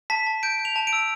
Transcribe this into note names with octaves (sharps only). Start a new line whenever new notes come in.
A5 B6
A5
G6 D7
G6
F7
A5
D7
E6